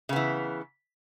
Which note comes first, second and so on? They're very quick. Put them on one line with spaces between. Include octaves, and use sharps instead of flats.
C#3 B3 E3